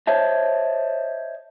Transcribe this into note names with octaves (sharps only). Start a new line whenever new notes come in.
C5 C#5 D#5 E5 A5